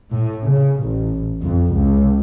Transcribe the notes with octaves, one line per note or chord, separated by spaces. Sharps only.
A2
C#3
A1
F2
C#2